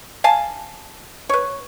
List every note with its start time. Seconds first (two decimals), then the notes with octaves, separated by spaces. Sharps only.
0.24 F5 G#5 A5
1.29 B4 C#5